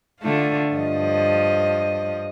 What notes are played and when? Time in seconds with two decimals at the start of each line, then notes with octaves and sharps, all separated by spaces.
0.21 D3 A3 F4
0.75 G2 F3 D#5